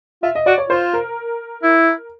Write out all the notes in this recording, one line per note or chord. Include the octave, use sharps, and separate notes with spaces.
F4 E5
D#5
F#4 D5
C#5
F4 C5
A#4
E4